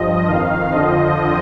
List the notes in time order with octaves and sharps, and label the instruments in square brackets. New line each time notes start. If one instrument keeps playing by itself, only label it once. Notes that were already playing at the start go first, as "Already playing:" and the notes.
Already playing: [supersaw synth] G2 F3 D#5
F2 D#3 F5
F2 D3 F3 D#5